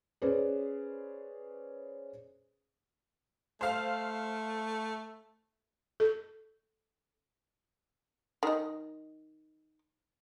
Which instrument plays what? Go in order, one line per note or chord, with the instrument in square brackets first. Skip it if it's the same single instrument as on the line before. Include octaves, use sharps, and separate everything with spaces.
[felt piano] C#4 G#4 B4 C5 D5
[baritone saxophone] A3 [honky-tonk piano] C5 F5
[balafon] A4
[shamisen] D#3 D#5